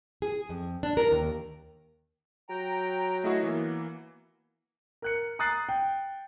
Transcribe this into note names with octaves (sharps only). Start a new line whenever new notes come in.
G#4
F2
D4
A#4
D#2
F#3 G5 A#5
A3 E4 F#4 G#4 D#5
E3 A#3 B3
A#4 F#6 C#7
A#5 D#6 F#6 A6 C7
G5